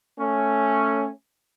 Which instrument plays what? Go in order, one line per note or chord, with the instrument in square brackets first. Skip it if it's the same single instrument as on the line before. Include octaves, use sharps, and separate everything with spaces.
[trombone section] A3 C#4